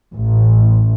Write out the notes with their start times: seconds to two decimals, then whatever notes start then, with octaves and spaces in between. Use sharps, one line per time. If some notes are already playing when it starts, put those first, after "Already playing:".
0.14 A1